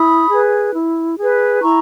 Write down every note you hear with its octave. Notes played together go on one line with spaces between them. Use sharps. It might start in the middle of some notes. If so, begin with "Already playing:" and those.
Already playing: E4 B5 D#6
G#4 B4
E4
G#4 B4
E4 A#5 C#6